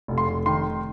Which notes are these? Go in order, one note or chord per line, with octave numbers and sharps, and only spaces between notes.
F1
C6
F1
D#3 C6